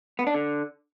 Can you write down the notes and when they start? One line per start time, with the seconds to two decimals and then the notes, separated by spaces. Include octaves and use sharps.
0.19 B3
0.27 D4
0.35 D3